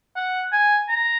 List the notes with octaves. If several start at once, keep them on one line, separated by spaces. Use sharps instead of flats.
F#5
G#5
A#5